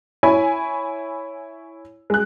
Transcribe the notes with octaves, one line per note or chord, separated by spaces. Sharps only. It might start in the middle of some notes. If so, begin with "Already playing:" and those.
E4 C#5 G#5 B5
G#3 F#6